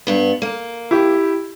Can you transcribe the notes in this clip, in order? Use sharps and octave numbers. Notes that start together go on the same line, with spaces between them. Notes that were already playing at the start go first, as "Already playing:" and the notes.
G2 B3
A#3
E4 G4